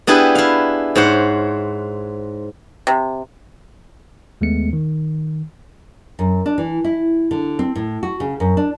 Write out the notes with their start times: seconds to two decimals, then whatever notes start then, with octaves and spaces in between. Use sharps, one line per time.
0.07 B3 D4 E4 G4 G#4 B4
0.35 E4 F5
0.96 G#2 C5 C#5 F#5
2.87 C3
4.41 D#2 G#3 A3 B3 C#7
4.73 D#3
6.19 F#2
6.46 D4
6.58 E3
6.84 E4
7.31 D3
7.59 C4
7.76 A2
8.03 F#4
8.20 C#3
8.40 F#2
8.57 D4